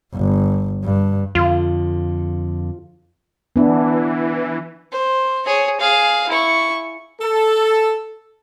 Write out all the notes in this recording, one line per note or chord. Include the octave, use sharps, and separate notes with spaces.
G1
G2
F2 D3 F4
E3 B3 D4
C5
G#4 C#5
G#4 F5
E4 C#6
A4